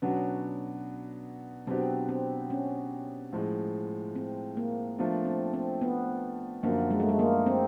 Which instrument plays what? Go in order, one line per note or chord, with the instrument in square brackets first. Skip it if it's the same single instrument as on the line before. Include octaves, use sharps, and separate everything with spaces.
[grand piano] B2 F#3 B3 D4 F#4 [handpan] C#4
[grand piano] B2 F#3 B3 D4 G4 [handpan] C4
[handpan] C4
C#4
[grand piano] A2 F3 G#3
[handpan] C4
A#3
[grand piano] F3 A3 D4 F4 [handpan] B3
[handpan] C4
C4
B3
[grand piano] F#2 D3 F3 [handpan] A#3
[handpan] G#3
A3
G#3
A#3
C4